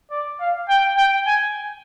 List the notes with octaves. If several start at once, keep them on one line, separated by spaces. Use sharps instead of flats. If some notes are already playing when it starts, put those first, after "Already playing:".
D5
F5
G5
G5
G#5